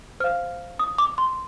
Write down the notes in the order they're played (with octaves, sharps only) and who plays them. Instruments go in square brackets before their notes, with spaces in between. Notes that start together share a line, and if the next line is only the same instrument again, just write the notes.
[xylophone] C5 F5 F6
D#6
D6
C6